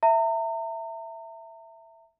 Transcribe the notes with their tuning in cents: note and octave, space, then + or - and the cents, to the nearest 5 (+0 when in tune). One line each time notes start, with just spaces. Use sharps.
E5 +0 A#5 -40